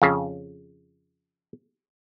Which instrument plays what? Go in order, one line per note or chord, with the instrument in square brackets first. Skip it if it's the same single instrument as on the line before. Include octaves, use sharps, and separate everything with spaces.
[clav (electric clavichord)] F2 C#3